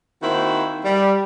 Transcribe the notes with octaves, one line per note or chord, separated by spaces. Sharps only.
D#3 A#3 C4 E4 F#4 C5
G3